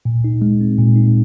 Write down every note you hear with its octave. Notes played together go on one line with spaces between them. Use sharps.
A#2
D#4
G#3
C4
A#2
D#4